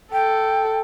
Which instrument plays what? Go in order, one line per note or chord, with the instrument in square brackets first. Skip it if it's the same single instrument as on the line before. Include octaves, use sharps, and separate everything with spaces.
[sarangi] A4 [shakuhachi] G5